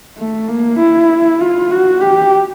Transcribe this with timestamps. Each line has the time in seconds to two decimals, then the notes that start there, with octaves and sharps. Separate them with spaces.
0.18 A3
0.48 A#3
0.79 E4
1.40 F4
1.70 F#4
2.00 G4